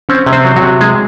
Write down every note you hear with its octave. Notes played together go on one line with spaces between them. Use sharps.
C4 C#4 C#5
C3
C4 C5
F#3
F#3 F#4
C3
G#3 G#4